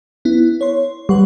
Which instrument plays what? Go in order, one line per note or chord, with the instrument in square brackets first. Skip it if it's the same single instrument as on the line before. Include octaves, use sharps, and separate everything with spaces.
[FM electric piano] B3 E4
C#5 C6
[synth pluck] G3 [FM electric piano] B4 F#5 C6